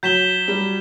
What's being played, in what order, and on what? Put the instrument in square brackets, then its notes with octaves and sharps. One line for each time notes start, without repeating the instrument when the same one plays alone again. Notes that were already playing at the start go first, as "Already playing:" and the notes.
[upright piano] F#3 [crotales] G6 B6 E7 G7
[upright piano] G3